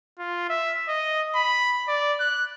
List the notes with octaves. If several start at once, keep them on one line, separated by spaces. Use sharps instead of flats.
F4
E5
D#5
B5
D5
F#6